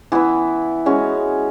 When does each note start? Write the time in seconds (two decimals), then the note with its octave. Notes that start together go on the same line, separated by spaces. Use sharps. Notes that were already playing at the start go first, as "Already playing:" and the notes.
0.12 E3 B3 E4
0.86 G#3 C#4 F#4